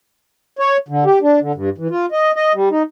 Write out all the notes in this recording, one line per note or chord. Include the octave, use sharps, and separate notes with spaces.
C#5
D3
G4
D4
D3
G2
E3
F4
D#5
D#5
G3
D#4